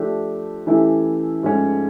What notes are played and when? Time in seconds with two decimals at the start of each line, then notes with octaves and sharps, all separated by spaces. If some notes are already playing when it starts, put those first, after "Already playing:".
Already playing: F3 A3 D4 G4
0.67 E3 A3 C#4 E4 G4
1.43 G#2 F3 A3 C#4